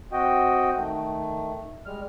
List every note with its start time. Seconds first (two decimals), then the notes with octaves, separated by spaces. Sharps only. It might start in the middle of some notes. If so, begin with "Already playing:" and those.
0.12 C4 F#4 D#5 G5
0.76 D#3 A3
1.86 G3 G#3 F6